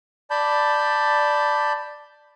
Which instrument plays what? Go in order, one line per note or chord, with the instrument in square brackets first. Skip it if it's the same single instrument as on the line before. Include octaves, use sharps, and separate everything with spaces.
[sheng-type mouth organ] D5 A5 B5 G6